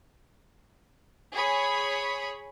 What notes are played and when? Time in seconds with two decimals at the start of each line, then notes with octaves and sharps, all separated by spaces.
1.33 G#4 C#5 B5